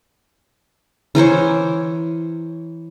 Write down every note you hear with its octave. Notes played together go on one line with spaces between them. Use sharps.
E3 A#4 C5 C#5